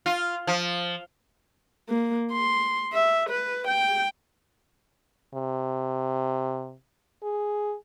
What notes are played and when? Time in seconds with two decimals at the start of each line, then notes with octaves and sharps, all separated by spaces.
0.06 F4
0.47 F3
1.89 A#3
2.32 C6
2.93 E5
3.30 B4
3.68 G5
5.34 C3
7.23 G#4